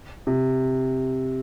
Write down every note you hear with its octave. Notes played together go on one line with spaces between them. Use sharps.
C3